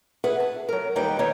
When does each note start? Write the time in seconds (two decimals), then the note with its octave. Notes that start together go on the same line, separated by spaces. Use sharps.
0.24 G#4 B4 E5 F#5
0.40 A5
0.69 F#3 A#4
0.96 D#2 G3 D#4 B4 G5
1.19 D#2 D#4 C#5